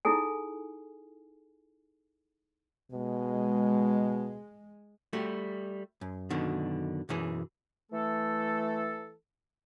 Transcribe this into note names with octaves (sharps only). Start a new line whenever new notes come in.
D#4 E4 G#4 A4 G#5
B2 G#3
G3 A3 F#4
F#2
F#2 B2 D3 D#3
B1 F#2 E3 G#4
E3 A3 A4